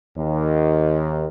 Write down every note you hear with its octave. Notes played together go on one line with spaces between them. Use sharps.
D#2